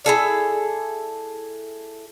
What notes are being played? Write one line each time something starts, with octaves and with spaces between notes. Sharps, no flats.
E4 G#4 A4 D5